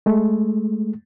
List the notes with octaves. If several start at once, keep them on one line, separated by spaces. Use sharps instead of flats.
G#3 A3